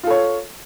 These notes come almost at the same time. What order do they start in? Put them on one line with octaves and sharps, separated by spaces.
F4 A4 C#5